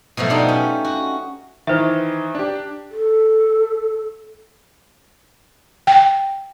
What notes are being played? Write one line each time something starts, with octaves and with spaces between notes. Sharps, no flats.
B2 F3 F#3 A3
D4 D#4 F4 G4 F#5
C#4
F#4
D#3 E3 C5 E5
D4 G4
A4
G5